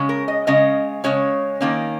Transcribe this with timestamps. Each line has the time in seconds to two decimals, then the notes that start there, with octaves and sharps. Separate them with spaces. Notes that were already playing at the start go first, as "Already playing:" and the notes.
Already playing: C#3 G#3 C#4
0.09 A#4
0.28 D#5
0.47 C#3 G#3 C#4 D#5
1.04 C#3 G#3 C#4 C#5
1.61 D#3 A#3 C#4